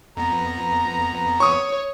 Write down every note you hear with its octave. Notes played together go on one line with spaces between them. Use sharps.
F2 B3 A#5
C#5 C#6 D#6